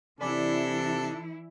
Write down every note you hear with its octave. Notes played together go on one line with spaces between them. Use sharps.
C3 E3 D4 E4 A4 D5 G#5 B5